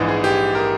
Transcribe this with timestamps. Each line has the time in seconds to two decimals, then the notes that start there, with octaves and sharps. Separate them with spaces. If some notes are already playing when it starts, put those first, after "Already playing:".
Already playing: A#1 G#2 E3
0.08 G#4
0.24 G4
0.55 A#4